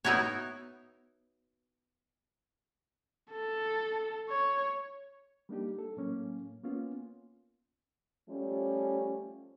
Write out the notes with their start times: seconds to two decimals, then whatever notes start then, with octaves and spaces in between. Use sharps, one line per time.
0.04 B3 D#4 E4 F#4 C#5
3.31 A4
4.29 C#5
5.49 G3 A#3 D4 D#4 G4
5.78 A4
5.97 A2 F#3 A#3 C#4
6.64 A#3 B3 C#4 F4
8.29 F3 G3 A3 C#4